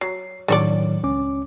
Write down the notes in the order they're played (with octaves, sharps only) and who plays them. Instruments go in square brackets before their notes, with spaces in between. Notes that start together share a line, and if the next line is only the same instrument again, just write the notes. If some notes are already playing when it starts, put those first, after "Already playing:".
[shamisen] F#3 [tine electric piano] C7
[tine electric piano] A2 D#3 F#3 [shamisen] D3 C#5 D5
[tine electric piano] C#2 C#4 D6